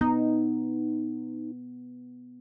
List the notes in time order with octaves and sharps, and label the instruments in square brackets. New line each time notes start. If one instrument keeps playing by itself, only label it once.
[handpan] B3 [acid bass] D#4